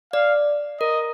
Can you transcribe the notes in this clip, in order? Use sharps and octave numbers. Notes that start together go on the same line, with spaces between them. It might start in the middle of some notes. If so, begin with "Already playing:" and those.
D5 F5
A#4 D#5